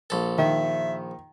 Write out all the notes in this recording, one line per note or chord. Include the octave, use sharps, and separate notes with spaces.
A#1 A4
D#3 E5